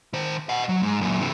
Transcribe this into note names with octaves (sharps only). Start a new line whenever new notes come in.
D#3 C5
D#5 F#5
F#3
G#2
F#2 A#2
C3 E3